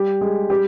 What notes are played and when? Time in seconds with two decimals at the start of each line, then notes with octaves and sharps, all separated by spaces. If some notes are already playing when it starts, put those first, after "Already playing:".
Already playing: G3 G4
0.21 G#3 G#4
0.50 G3 G4